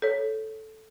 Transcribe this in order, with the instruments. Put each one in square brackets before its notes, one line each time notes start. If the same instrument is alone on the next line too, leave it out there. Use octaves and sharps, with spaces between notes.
[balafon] A4 C#5